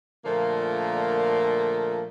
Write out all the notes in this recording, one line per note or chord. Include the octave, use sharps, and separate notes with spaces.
A#2 D3 F3 A3 A#3